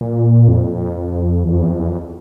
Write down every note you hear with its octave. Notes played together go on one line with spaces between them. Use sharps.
A#2
F2
E2
F2
E2
F2
E2
F2